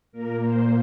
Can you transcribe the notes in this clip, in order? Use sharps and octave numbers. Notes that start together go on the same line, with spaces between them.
A#2 A#3 A#4
C5